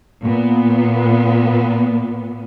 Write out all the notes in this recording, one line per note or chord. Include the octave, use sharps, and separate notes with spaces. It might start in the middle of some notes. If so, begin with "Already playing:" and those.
A#2 B3